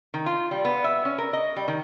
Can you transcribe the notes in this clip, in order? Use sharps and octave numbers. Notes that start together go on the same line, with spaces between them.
D#3
F4
G3
B3
E5
C#4
A#4
D#5
G3
D#3